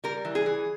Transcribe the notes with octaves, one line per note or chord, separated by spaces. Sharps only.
G3 A#4
E3
G#4
E3